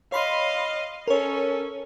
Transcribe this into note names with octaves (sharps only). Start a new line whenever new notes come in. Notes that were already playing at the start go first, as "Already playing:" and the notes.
C#5 D#5 F5 B5 C6
C#4 A4 A#4 C#5